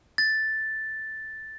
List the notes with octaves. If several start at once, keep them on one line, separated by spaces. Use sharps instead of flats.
A6